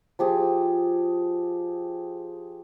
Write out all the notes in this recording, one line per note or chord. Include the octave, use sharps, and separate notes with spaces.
F3 G4 G#4